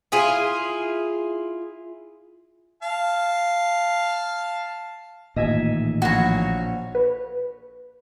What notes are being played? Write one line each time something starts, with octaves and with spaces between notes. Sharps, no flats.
E4 F4 G#4
F5 A5
A1 A#2 D#3 D#5 E5 G#5
A#1 F#4 C#5 A#6
B4